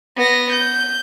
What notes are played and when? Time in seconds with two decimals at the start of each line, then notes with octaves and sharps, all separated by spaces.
0.17 B3 A#6
0.52 G6